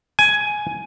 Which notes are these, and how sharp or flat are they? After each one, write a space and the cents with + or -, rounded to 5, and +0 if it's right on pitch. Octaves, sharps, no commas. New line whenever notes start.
G#5 +10